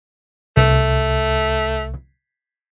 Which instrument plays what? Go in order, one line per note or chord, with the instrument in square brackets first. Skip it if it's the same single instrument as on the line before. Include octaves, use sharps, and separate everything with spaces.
[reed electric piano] C2 [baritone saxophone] A3